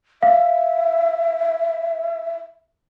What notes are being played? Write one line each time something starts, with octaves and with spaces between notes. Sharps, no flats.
E5 F5